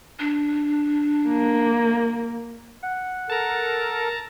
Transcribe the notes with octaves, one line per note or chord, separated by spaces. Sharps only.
D4
A#3
F#5
A4 A#4 A5 A#5